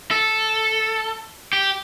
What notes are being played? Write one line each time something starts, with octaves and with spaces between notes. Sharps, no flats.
A4
G4